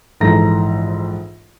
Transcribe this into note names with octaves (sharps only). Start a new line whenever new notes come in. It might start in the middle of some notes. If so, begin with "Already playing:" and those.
A#1 G#2 E3 A4 A#5 A#6